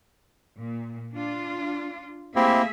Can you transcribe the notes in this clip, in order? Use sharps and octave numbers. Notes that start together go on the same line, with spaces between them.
A#2
D4 F4
A3 A#3 C4 E4 G4 G#4 E5